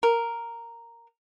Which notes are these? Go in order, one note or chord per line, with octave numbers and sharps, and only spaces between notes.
A#4